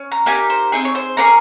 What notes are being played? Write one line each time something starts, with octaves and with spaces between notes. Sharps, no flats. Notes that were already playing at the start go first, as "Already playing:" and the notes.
Already playing: C#4
A#5
A#3 D#4 G4 G#5
C5
C4 D#4 G#4
C#5
C5
A#3 C#4 G#4 A#5